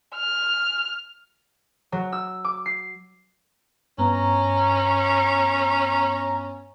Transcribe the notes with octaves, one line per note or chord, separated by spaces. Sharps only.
F6
F#3
E6
D6
C7
G2 B3 C#4 A#5